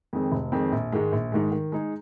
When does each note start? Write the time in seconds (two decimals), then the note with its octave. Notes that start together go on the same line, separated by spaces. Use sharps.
0.13 F2 D#3 G#3 C4
0.32 F1
0.52 F2 D#3 G#3 C4
0.72 A#1
0.92 G#2 D#3 G#3
1.12 A#1
1.32 G#2 D#3 G#3
1.52 D#3
1.72 G#3 D#4 G#4